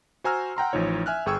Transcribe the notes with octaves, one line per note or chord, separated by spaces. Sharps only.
F#4 C5 G#5 A#5 E6 F6
F#5 G5 A#5 C6
A1 F3 D#4 C#5
E5 G#5 F6 F#6
G1 G#4 G5 C#6 E6 G#6